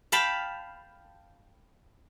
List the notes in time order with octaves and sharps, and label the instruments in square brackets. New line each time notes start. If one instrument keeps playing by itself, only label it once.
[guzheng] F5 G5 A5 B5